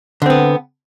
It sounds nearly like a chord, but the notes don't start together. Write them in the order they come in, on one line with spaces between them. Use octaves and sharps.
D3 C4 B3